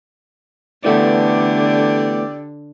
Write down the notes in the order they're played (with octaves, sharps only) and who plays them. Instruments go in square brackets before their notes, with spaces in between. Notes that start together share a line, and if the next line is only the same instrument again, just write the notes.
[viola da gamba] D3 [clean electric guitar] E3 A3 B3 [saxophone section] G4 A4 D5